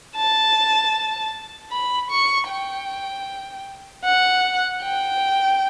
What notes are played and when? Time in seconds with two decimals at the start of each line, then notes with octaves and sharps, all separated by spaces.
0.16 A5
1.71 B5
2.10 C#6
2.49 G5
4.05 F#5
4.82 G5